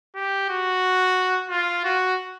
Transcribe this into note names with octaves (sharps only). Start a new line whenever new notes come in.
G4
F#4
F4
F#4